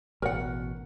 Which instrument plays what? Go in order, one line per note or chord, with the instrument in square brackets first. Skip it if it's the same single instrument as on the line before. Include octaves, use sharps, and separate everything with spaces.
[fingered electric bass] A1 B2 [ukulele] A#4 F#5